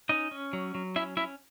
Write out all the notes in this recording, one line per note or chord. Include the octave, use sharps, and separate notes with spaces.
C#4 D#4 D#5
C#4
F#3
F#3
C#4 E4 E5
C#4 E4 E5